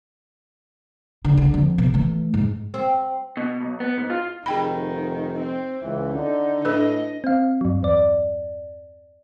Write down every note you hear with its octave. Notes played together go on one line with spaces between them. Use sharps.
D3
D3
F2
B2
E3 A3
G#2
C4
B2
B1
B3
G#2
F4
F1 D#3 G#4 G5 B5
C4
C#2 E3
D3 D#4
A2 D4 A4 B4 D#5
C4 F5
G2 F#3
E2 D5